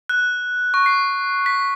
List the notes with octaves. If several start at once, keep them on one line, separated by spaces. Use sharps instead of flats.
F#6
C#6
C7
B6